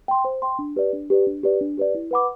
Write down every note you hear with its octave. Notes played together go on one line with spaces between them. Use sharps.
G5 C6
C5
G5 C6
D4
G4 B4 D5
D4
G4 B4 D5
D4
G4 B4 D5
D4
G4 B4 D5
E4
B4 F#5 B5 D6